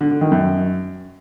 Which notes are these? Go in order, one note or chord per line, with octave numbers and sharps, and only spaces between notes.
D3
D3
D#3
F#2